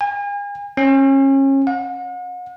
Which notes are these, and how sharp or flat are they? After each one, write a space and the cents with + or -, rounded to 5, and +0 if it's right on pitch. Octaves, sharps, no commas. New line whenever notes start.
G#5 -40
C#4 -30
F#5 -40